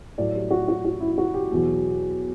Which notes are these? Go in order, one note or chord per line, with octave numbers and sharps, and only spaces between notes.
A2 F#3 D5
G4
F#4
F#4
F#4
E4
E4
F#4
G4
E2 B2 F#3